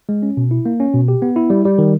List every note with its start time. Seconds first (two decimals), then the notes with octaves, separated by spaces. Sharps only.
0.09 G#3
0.23 C#4
0.37 B2
0.51 E4
0.66 A#3
0.80 C#4
0.94 B2
1.08 G4
1.22 B3
1.36 E4
1.50 G3
1.65 G3
1.78 D#3